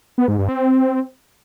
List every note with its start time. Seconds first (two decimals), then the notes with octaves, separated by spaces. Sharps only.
0.18 B3
0.28 G#2
0.38 G2
0.49 C4